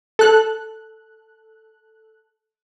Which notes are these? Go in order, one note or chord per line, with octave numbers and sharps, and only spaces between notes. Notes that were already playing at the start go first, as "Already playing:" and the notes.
A4 F#6